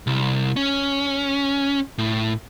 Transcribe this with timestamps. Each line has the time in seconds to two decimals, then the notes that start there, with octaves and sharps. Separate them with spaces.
0.07 C2
0.56 C#4
1.98 A2